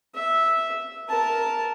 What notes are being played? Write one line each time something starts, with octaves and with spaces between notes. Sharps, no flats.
E5
A#4 A5